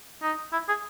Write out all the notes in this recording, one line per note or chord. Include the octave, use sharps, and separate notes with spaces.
D#4
E4
G#4